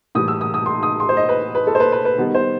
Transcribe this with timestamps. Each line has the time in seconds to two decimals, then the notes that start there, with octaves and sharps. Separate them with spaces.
0.15 A2 E3 G3 D#6
0.28 E6
0.41 D#6
0.54 D#6
0.66 C6
0.83 D#6
1.00 C6
1.09 C5
1.17 D#5
1.29 B4
1.55 B4
1.67 A4
1.75 C5
1.80 B4
1.92 B4
2.05 B4
2.18 D#3 G3 B3
2.34 C5